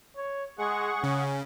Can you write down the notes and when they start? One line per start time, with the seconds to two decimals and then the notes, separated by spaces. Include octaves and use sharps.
0.16 C#5
0.59 G#3 G#4 F#5 C#6
1.03 C#3 C#4